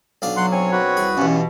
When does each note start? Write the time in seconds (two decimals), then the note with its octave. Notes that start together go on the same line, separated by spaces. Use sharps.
0.22 B1 D4 F5
0.37 F#3 F#5 C6
0.52 C4 C#5 G#5
0.72 F#4 B4
0.97 C2 G#4
1.17 E2 G2 B2 C#4